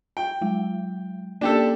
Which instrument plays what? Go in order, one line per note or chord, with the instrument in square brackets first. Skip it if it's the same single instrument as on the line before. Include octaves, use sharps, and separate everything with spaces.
[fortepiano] G5
[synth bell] F#3 G#3
[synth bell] A#3 C#4 [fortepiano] D4 G4 A4